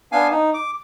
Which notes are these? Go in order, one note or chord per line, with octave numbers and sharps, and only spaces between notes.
B3 D4 F5 G#5
D#4
D6